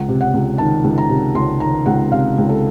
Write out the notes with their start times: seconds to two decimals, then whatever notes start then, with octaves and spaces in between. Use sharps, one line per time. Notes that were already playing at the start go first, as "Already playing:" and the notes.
Already playing: C#2 F#5
0.08 C3
0.21 F#5
0.34 C#2
0.58 D#3 A5
0.84 C#2
0.98 A#5
1.09 C3
1.35 C#2 C6
1.60 D#3 A#5
1.86 C#2 F#5
2.11 C3 F5
2.38 C#2
2.49 A4